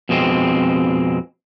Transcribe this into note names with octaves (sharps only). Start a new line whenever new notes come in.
F2 B2 G#3 C4